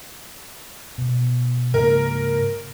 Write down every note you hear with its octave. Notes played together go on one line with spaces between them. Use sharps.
B2
G#2 C#3 A#3 A#4